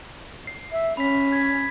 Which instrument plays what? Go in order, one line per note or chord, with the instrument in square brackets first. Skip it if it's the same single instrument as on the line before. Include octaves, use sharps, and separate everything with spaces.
[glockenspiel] C7
[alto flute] E5
[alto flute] C#4 [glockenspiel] B5 B6
[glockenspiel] G#6 B6